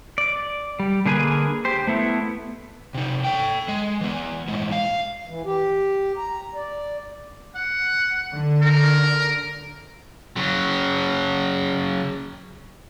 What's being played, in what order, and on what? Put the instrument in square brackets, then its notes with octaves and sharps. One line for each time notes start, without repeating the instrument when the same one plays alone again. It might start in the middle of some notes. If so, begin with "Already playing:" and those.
[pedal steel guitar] D5
G3
D3 A#3 G#4 B4 G#5
G4 C5
A3 B3 E4
[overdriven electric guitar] C3 D#4
A4 G5
G#3
E3 B3
A2 G#3
F5
[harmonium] E3
G4
A#5
D5
[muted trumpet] F#5
[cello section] D3
[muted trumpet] A#4
[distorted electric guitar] C#3 F#3